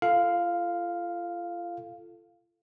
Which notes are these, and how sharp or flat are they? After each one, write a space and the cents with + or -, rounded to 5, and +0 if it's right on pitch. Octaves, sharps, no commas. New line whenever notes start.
F4 -35 A4 +0 F5 +0